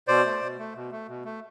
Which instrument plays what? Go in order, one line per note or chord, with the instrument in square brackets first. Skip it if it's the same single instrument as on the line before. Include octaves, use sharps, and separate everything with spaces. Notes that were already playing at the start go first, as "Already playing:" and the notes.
[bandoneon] B2 C5 D5
A3
B2
A3
B2
A3
B2
A3